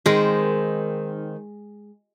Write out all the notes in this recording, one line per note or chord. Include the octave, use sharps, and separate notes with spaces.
D#3 G#3 C4